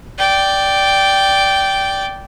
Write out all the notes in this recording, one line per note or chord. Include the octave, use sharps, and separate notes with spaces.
D5 G5